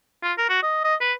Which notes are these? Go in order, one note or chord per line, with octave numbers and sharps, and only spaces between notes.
F4
A#4
F#4
D#5
D#5
B4